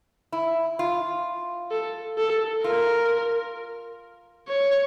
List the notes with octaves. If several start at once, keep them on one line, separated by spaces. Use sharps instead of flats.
E4
F4
A4
A4
F4 A#4
C#5